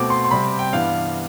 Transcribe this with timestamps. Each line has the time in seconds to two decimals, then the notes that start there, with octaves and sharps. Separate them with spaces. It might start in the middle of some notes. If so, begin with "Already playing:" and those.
Already playing: B2 A3 C4 D6
0.10 C6
0.24 C6
0.31 C3 G3 C4 B5
0.59 G5
0.73 G2 E3 B3 F5